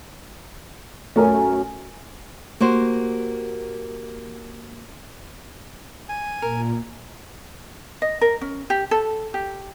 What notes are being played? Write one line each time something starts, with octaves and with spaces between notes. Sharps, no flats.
F#2 A3 C#4 A#4 G#5
A#3 F#4 G4 C5
G#5
A#2 A#4
D#5
A#4
C#4
G4
A4
G4